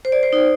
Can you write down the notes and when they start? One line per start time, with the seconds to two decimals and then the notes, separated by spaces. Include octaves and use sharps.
0.05 C5
0.12 D5
0.23 C5
0.33 D#4